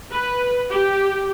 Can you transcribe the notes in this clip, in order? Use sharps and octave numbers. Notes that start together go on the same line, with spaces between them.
B4
G4